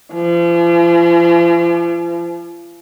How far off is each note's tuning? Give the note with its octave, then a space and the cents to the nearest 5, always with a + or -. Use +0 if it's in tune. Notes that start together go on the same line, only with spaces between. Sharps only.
F3 -40